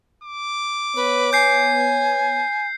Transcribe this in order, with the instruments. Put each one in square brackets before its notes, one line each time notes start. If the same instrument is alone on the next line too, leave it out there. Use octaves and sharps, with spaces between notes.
[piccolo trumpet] D6
[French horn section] B3 C#5 [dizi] B4
[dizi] G#5 [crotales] G6 C7